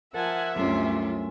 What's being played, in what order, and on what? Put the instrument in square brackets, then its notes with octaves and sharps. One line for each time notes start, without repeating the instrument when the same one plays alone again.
[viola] F3 G#5 [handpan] A#4 [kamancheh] E5 [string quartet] F#5 A5
[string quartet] D2 G2 C3 [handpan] F#3 A3 C#4 [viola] F4